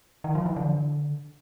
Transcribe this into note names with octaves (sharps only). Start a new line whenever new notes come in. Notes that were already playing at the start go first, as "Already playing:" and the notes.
D#3
F3
E3
D3